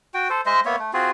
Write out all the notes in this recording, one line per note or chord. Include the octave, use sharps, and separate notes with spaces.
F#4 G5
A4 C5
G#3 C5 D#5 E5
A#3 B3 C#5 E5
A3
C4 F4 F#4 G#4